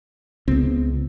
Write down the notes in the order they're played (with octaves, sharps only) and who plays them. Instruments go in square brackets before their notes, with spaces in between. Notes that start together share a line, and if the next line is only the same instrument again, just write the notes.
[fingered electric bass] C#2 [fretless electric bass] B3 C4